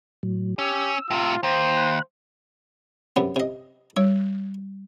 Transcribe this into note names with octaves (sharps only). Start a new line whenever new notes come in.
A2 F#3
C#4 G4 E6
A2 C3 F4
D#2 C5
B5 F#6
F#2 C3 B3
C3 D#5
G3 C#5